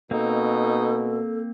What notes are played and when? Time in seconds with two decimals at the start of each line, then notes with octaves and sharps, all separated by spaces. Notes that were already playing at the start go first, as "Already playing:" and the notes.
0.11 B2 A#3 C4 D#4 A4